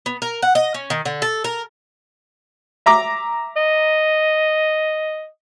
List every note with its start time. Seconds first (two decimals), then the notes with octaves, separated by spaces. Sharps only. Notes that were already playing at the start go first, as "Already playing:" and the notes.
0.06 B3
0.22 A#4
0.42 F#5
0.55 D#5
0.74 C#4
0.90 D#3
1.06 D3
1.22 A4
1.44 A#4
2.86 E5 A#5 D6
3.57 D#5